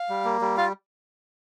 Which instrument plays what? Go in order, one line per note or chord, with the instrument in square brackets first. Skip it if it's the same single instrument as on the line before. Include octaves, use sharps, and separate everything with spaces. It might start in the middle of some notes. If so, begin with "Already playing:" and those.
Already playing: [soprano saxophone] F5
[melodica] G3
A#3
G3
[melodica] F4 [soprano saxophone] F5